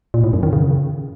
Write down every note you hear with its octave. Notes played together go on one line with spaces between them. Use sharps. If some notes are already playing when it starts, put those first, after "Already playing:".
A#2
A2
F#2
D#3
C#3